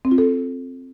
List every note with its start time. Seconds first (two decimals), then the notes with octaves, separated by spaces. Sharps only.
0.05 C4
0.11 F4
0.18 A4